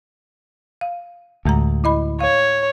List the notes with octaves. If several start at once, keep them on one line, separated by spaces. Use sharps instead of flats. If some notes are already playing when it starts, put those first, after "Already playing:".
F5
D2 A2 G#3 A#5
E4 D#5 B5
C#5 F5